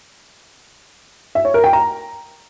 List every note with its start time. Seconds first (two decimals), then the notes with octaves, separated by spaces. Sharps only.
1.35 E5
1.45 C#5
1.54 A#4
1.64 G5
1.73 A#5